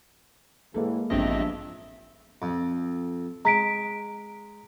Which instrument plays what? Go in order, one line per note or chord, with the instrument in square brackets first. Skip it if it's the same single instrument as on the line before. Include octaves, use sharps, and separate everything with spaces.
[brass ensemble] A2 E3 [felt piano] G#3 A#3 A4
[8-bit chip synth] A1 C4 D#5 [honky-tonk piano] G2 [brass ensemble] F3 B3 E5
[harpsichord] F2
[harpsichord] G#3 [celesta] A#5 B6 D7